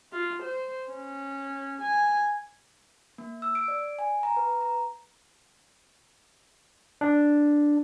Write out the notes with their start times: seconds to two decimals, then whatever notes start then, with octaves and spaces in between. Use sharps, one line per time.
0.12 F4
0.43 C5
0.92 C#4
1.82 G#5
3.18 A#3
3.42 E6
3.55 D7
3.68 D5
3.99 G#5
4.23 A#5
4.37 B4
4.61 A#5
7.01 D4